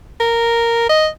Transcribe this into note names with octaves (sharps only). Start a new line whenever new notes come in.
A#4
D#5